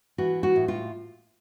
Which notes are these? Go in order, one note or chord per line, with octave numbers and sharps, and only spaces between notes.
E3 F#4
F#4
A2
F4